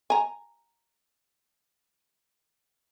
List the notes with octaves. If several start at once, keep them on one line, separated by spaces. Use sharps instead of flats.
G#5 A#5